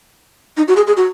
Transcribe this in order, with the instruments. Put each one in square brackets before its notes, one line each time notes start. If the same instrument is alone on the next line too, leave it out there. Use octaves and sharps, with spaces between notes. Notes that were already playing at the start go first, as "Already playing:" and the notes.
[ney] D#4
F#4
G#4
G#4
F#4